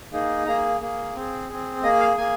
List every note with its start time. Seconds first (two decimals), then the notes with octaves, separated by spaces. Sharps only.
0.13 A#3 D#4 G#4
0.46 A#3 G#4 A#5
0.81 A#3 G#4
1.15 C4 G#4
1.49 C4 G#4
1.83 A#3 G#4 D#5
2.00 F5
2.17 A#3 G#4 G#5